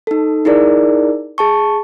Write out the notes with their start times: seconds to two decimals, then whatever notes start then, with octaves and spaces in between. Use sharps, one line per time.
0.07 D#4 A4
0.45 D#4 E4 G#4 A#4 D5
1.38 G#4 A5 C#6